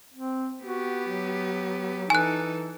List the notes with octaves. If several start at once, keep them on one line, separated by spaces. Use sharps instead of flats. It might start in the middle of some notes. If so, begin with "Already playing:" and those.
C4
B3 F#4 G4
F#3
E3 D#4 A4 G#5 F#6